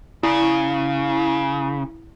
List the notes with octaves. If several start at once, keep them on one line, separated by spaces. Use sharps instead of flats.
C#3 E4